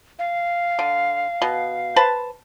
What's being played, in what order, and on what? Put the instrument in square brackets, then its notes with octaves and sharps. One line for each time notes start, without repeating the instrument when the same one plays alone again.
[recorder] F5
[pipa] D3
B2
B4 C5 A5